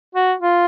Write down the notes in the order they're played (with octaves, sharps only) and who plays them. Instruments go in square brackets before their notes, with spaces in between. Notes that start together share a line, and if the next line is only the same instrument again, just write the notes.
[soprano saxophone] F#4
F4